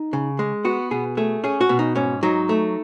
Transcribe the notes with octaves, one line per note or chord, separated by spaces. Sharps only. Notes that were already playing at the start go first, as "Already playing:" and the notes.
Already playing: D#4
C#3
G#3
B3 F#4
B2 G#4
A3 G#4
C#4 G#4
F#4
B2
D#4
G#2 C#4
F#3 D#4
A3